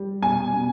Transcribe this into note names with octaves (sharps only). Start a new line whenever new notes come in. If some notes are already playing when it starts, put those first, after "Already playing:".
Already playing: G3
B2 G#5
B2